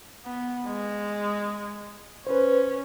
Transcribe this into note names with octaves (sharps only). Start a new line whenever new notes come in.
B3
G#3
C#4 B4 C5